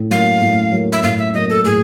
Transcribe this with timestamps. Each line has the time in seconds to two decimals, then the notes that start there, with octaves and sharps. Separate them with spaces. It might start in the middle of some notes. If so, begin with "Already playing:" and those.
Already playing: A2
0.11 F#3 A#3 F5
0.42 A2
0.72 F#3 A#3
0.92 E5
1.03 A2 F5
1.18 E5
1.34 F#3 A#3 D#5
1.50 A4
1.65 A2 G#4